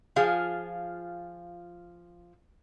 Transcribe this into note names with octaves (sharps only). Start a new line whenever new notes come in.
F3 F4 G#4 F5